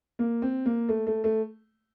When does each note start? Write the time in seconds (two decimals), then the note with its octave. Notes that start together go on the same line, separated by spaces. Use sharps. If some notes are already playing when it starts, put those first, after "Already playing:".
0.19 A#3
0.42 C4
0.66 A#3
0.89 A3
1.07 A3
1.24 A3